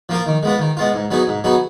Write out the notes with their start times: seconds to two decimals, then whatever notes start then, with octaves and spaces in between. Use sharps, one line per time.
0.09 F3 A#3 F4 A#4
0.26 D#3
0.43 G#3 B3 F4
0.59 D#3
0.77 G#3 B3 F4
0.94 G#2
1.11 F#3 B3 D#4 G#4
1.27 G#2
1.44 F#3 B3 D#4 G#4